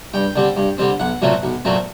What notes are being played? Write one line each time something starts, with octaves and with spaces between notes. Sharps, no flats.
G2 G5
D3 G3 C4
G2
D3 G3 C4
B1 F#5
A#2 F#3 A3 C4
B1
A#2 F#3 A3 C4